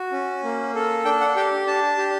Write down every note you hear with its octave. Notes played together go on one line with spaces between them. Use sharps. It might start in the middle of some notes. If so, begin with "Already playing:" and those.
Already playing: F#4
C#4
A#3
A4
D4 G5
F#5
G4 G5
D4 A5
G4